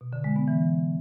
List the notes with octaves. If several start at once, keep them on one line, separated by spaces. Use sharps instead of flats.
B2
D3
G#3
B3
E3